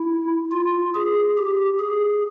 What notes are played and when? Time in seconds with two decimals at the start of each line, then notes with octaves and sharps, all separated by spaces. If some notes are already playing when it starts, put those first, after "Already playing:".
Already playing: E4
0.52 F4
0.95 G#4
1.37 G4
1.79 G#4